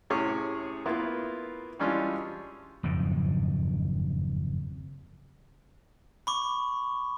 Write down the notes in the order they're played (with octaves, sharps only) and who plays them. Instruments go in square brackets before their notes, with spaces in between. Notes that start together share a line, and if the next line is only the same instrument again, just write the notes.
[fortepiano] A2 C3 C#4 G#4 C#5 D6
A#3 B3 E4 F4
E3 G3 G#3 C#4 D4 F4
[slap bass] F#1 F2 G#2 D#3
[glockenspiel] B5 C#6 D6